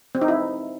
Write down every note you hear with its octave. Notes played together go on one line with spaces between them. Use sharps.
C4
D#4
E4